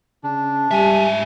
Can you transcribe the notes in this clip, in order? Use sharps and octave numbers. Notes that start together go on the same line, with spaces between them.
C#3 D4
G#2 G3 E5 G#5